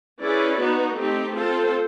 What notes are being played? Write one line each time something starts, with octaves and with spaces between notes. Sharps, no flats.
C#4 E4 G#4 B4 D5
B3 D#4 F#4
A3 C4 D#4 G4
C4 F4 A4 C5